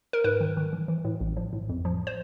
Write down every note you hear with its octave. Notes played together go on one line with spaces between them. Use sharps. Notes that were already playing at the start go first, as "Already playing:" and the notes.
A#4
G#2 B4
D#3
D#3
E3
E3
A2
A1
F3
A2
F2
F3
C5